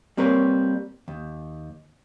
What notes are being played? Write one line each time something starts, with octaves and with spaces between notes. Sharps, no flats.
G3 A#3 C4 A#4 B4 C#5
D#2